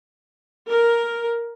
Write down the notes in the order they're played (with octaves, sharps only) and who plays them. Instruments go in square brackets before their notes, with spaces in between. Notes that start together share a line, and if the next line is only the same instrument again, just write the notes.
[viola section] A#4